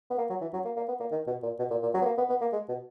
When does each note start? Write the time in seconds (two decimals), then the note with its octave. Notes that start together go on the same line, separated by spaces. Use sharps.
0.10 B3
0.18 A#3
0.30 F#3
0.41 E3
0.53 F#3
0.65 A#3
0.76 A#3
0.88 B3
1.00 A#3
1.11 D#3
1.27 B2
1.43 A#2
1.59 B2
1.71 A#2
1.83 A#2
1.94 F#3
2.02 B3
2.05 A#3
2.18 B3
2.29 B3
2.41 A#3
2.52 G#3
2.69 B2